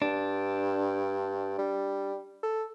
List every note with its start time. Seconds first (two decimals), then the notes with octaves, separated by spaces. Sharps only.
0.02 G2 D4
1.59 G3
2.43 A4